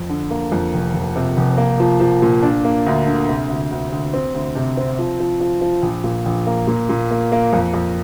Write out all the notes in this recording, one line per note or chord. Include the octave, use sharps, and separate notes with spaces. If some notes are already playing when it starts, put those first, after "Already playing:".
Already playing: F2
D3
A#3
F2
F1
F1
C3
F1
A#3
F3
F3
A#2
D4
A#3
D2
D3
C3
D2
D2
D2
C4
D2
C3
C4
F3
F3
F3
F3
A#1
A#2
A#1
A#3
A#2
A#2
A#3
A#3
F2
F2